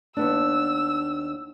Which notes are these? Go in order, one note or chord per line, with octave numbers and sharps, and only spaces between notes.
D#2 B3 D4 E6